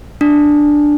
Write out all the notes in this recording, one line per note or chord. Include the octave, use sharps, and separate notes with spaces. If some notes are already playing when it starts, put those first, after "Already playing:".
D4